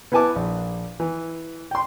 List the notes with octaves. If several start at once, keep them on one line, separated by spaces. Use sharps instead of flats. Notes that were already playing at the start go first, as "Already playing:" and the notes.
B3 E4 B4 G#5 A5 D6
A#1
E3
G5 C6